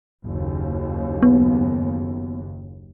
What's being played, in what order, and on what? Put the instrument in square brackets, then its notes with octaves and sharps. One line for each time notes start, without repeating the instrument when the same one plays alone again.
[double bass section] F#1 D#2
[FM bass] B3